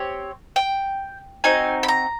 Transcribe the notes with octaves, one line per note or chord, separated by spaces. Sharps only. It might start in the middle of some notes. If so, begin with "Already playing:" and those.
Already playing: C4 G4 C#5
G5
C4 D#4 F#4 G#5
B5
A#5